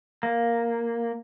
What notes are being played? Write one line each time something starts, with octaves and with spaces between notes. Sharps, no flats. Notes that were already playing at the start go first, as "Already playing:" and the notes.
A#3